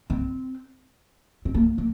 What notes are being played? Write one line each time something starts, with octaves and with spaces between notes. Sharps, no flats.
C4
C4
A#3
A#3